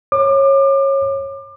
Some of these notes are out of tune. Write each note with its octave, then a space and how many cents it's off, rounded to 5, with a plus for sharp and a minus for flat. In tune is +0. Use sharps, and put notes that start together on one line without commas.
C#5 -20 D6 +30